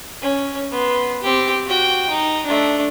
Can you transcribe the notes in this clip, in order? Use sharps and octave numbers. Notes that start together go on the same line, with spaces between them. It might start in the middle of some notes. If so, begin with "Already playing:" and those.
C#4
B3 C6
C4 G4
F#4 G5
D#4
A3 D4